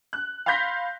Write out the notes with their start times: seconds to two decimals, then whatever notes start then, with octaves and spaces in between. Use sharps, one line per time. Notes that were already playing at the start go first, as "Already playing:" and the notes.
0.13 F#6
0.46 F5 B5 C6 G6 A#6 B6